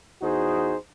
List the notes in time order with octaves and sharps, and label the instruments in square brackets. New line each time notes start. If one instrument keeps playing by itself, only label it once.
[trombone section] E2 D#4 F#4 G#4 C5